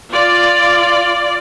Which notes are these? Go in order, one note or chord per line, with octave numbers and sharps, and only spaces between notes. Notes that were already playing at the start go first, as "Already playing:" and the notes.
F4 D5